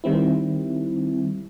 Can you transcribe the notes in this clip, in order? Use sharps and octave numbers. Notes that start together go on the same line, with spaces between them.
D#3 G3 C4 E4